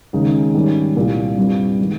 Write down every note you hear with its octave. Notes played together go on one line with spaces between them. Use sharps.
D#2 C#3 G#3 D#4
G#2 D#3 G3 C#4
C2 A#2 G3
G2 G3 C4 F4
D#3 G#3